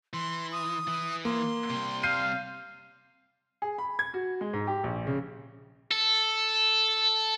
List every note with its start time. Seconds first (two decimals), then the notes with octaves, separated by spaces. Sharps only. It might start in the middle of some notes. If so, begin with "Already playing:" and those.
0.14 E3 C6
0.52 D#6
0.87 E3
1.25 A#3 C6
1.70 C3 G3
2.03 F5 G6 C7 D#7
3.62 G#4
3.78 B5
3.99 G#6
4.14 F#4
4.41 G#3
4.53 G#2
4.67 G4
4.84 A#1
5.07 C#3
5.91 A4